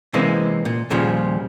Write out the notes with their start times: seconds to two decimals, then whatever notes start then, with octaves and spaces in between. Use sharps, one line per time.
0.14 C3 E3 G#3 A#3 C4 C#4
0.65 A#2
0.90 D#2 A#2 C#3 F3 G3